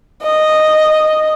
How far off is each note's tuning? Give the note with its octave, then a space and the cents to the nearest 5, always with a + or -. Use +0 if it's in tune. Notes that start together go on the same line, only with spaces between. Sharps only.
D#5 -5